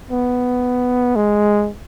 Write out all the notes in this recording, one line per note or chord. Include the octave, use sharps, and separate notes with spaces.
B3
G#3